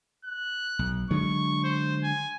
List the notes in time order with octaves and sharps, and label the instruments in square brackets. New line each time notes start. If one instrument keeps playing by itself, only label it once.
[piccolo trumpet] F#6
[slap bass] B1
[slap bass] D3 F#3 G#3 [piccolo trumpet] C#6
[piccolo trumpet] C5
G#5